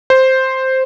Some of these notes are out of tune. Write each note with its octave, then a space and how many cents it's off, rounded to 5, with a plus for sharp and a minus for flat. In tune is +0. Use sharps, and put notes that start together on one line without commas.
C5 +0